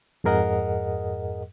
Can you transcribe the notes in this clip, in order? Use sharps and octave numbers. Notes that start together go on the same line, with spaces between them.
F2 G#2 G#4 A#4 D#5 F#5